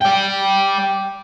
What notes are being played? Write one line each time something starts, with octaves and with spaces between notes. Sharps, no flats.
D5 G5